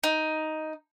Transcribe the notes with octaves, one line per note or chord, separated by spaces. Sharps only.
D#4